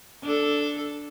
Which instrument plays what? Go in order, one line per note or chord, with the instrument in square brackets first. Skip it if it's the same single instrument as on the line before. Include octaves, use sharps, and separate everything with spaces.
[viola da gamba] D4 A4